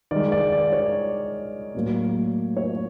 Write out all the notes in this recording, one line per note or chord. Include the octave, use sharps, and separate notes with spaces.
D#3 G#3 D5
D5
D5
C#5
A2 F#3 A#3
C#5